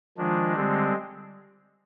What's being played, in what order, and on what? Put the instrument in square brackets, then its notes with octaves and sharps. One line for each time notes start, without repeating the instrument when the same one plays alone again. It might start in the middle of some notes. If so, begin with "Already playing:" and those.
[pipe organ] D#3 G#3 D4 [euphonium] F3
[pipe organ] D3 G#3 C4 [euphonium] G3